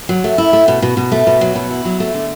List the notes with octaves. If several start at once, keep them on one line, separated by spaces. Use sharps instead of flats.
F#3
A3
E4
A3
B2
B2
B2
A3
B2
F#3
B2
E4
F#3
A3
D3